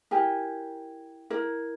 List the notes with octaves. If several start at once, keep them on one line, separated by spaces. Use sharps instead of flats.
E4 G4 A#4 G#5
E4 A#4